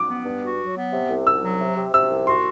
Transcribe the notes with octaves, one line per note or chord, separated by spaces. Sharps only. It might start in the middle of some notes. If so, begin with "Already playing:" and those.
Already playing: D6
B3
G2
F#4
F#3
B3
C3
C2
C2 E6
F#3
C3
C3
C3 E6
C2
F#4 C6